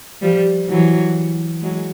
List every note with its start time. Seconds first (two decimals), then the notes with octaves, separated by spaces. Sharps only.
0.22 F3 G3
0.69 E3 F#3
1.62 F#3 G#3